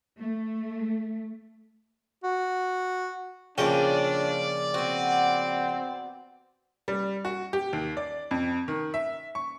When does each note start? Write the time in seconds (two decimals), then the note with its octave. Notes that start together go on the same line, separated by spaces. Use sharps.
0.18 A3
2.23 F#4
3.58 A#1 C#3 C#4 D4 F4 D5 G5
4.74 B3 C4 F#4
6.88 G3
7.25 F#4
7.53 G4
7.73 D#2
7.97 D5
8.31 F2
8.68 D#3
8.94 E5
9.35 C#6